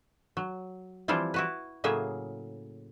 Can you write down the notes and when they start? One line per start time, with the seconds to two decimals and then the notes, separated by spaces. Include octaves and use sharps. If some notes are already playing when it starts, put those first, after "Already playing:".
0.37 F#3
1.08 E3 F3 G3 C4 E4 F4
1.34 E4 F#4 B4
1.84 A2 C#3 F#3 A#3 G#4 E5